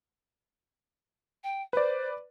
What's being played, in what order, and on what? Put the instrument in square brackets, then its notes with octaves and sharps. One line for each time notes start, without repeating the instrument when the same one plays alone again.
[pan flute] G5
[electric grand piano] B4 D5 [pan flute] C5